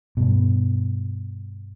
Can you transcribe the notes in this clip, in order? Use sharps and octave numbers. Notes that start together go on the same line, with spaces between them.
G2 B2